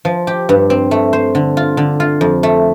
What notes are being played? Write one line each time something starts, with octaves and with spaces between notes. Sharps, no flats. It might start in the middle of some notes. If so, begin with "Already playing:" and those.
F3
G4
G2
C4
A3
C5
D3
F4
D3
F4
F2
A3